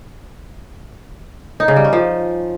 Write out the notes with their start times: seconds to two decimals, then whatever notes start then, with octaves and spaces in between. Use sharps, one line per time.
1.60 D#4
1.68 C#3
1.76 G3
1.84 C#4
1.93 F3